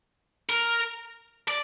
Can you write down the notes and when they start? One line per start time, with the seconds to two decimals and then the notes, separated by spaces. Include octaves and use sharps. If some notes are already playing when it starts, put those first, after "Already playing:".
0.49 A#4
1.48 D5